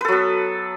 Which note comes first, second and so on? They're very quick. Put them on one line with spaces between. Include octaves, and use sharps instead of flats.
B4 A4 F#3 B3